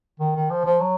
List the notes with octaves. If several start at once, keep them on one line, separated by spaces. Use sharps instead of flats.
D#3
D#3
F3
F3
F#3